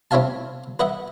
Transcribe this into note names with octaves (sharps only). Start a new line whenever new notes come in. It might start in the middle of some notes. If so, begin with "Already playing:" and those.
C4 E4 C#5 E5 F5 A5
B4 D#5 E5 F#5